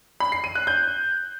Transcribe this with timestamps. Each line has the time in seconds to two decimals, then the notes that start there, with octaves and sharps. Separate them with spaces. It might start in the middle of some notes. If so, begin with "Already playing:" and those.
0.20 B5
0.32 C7
0.44 D#7
0.55 F#6
0.67 G6